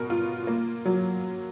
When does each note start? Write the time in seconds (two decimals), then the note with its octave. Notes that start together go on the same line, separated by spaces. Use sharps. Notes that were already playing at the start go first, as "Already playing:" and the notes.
Already playing: B2 A#4
0.10 F4
0.47 A#3
0.85 F#3